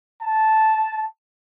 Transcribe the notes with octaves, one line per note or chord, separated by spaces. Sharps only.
A5